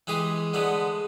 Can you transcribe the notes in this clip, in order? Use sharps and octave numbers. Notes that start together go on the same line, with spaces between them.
E3 G#3 G4 G#4
D3 G#3 A3 B3